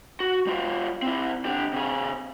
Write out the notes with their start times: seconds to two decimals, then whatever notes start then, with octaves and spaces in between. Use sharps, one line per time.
0.20 F#4
0.47 G3 F4
1.02 C4 E4
1.45 D3 G4
1.73 C3 G#4